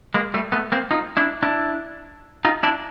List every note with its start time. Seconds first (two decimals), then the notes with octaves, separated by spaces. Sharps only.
0.14 G#3 A#3
0.34 G3 A3
0.52 A3 B3
0.72 A#3 C4
0.91 D#4 F4
1.17 D4 E4
1.43 D4 E4
2.45 D#4 F4
2.63 D4 E4